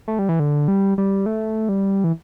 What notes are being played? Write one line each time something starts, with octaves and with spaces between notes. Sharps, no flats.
A3
G3
E3
D3
G3
G3
A3
G3
E3